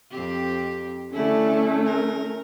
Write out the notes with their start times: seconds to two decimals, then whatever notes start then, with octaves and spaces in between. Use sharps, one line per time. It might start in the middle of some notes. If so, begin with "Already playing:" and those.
0.11 F2 C4 G4
1.13 D3 A3 C#4 E4
1.86 A#4